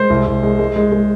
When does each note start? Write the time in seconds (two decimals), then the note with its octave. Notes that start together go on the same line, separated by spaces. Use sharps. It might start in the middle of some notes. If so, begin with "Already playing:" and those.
Already playing: G#3 C5
0.10 C2
0.27 C2
0.43 G#3
0.59 G#3
0.76 G#3
0.92 G#3